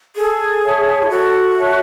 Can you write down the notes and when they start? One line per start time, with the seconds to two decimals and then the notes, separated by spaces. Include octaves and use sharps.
0.15 G#4 A4
0.63 C#5 E5 A5
1.03 E4
1.09 F#4 A4
1.56 C#5 E5 A5